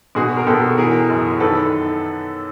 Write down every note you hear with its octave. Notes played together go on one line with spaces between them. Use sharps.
B2 F#4 G#4
A#4
B2 G4 A4
E3 G#4 A#4
F#2
D#3 A4 B4